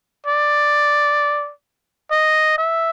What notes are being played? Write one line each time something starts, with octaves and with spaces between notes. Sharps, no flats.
D5
D#5
E5